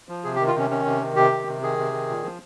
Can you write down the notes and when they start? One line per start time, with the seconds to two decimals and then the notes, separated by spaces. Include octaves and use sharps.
0.09 F3
0.24 C3 G#4
0.36 G4
0.39 D#3
0.47 F4
0.55 C3 C#4
0.70 D#3 C#4
0.86 C3
1.02 D#3
1.16 C3 G4
1.32 D#3
1.47 C3
1.62 D#3 G#4
1.78 C3
1.92 D#3
2.08 A#2
2.24 F3